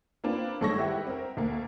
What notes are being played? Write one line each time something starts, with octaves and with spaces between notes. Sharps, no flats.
A#3 C4 D4 F4 B4
G#1 G2 A4 C#5 C#6 A#6
E4 G4 B4 E5 F#5 G5
C4 A#4
D2 A3 A#3